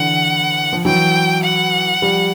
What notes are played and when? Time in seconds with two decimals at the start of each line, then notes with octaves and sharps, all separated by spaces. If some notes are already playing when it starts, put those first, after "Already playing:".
Already playing: D3 E3 F#5
0.73 F3
0.85 E3 F#3 G5
1.44 F#5
2.02 F3 G3